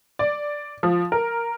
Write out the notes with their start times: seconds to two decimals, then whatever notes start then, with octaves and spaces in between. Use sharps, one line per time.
0.19 D5
0.83 F3
1.12 A#4